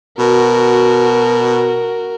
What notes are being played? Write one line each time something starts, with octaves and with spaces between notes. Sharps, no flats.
B2 F#4 A#4